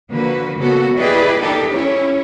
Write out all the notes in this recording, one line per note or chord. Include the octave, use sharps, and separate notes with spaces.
D3 F3 A#3 F#4 B4
C#3 A#3 B3 F#4 A4
E4 G4 G#4 B4 D5 D#5
A#3 D4 D#4 G4 A4
C#4 E4 C#5